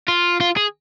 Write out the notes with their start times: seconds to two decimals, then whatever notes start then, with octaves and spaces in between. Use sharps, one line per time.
0.08 F4
0.40 F4
0.57 G#4